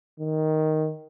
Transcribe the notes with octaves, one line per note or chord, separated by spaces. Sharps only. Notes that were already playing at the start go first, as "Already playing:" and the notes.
D#3